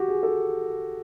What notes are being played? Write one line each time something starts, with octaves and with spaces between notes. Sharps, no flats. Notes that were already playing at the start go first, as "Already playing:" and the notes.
Already playing: F#4 G4
G#4
A4